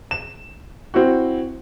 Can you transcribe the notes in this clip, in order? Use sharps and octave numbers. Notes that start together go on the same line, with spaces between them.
E7
C4 E4 F#4